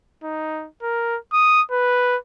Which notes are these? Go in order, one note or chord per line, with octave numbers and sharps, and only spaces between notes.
D#4
A#4
D#6
B4